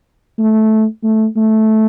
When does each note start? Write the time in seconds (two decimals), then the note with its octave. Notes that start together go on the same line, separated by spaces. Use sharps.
0.39 A3
1.03 A3
1.37 A3